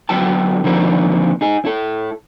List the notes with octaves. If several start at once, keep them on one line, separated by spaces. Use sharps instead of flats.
D2 F#3 B3 E4 G5 A5
D3 D#3 F3 A#3 C4 E4
D#4 G#4
E4 A4